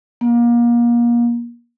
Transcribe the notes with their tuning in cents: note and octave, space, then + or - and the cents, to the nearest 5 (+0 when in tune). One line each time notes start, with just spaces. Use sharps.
A#3 +30